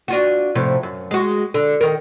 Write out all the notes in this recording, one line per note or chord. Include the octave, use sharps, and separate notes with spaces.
D4 F4 F#4
A2 C3 F3
F#2
G#3 F#4
D3
D#3 A#4